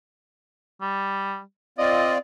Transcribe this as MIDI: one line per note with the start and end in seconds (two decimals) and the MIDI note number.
0.81 1.41 55
1.78 2.18 60
1.78 2.18 65
1.78 2.18 74
1.78 2.15 75